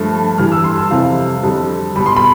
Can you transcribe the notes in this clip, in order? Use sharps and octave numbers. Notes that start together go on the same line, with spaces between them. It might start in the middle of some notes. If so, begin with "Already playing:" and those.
Already playing: G2 F3 A3
G2 E3 G3 F6
E6
C6
A5
F2 C3 E3 G3 F5
F2 D3 G3
B2 G3 B5
C6
B5